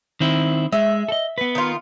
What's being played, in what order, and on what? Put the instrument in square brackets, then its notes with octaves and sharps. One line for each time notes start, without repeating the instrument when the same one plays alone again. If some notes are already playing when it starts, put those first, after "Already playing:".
[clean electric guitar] D#3 C4 E4
[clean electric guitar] G#3 [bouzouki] E5
[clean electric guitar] A4 D#5
B3 B4
[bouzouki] D#3 F4